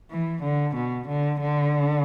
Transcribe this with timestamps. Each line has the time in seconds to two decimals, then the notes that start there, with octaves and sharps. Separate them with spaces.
0.11 E3
0.43 D3
0.75 B2
1.08 D3
1.40 D3